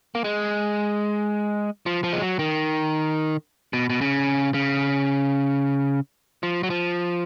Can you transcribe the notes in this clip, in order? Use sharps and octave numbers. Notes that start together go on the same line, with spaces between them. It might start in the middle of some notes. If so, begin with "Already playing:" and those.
A#3
G#3
F3
F3
G#3
F#3
D#3
B2
B2
C#3
C#3
F3
F#3
F3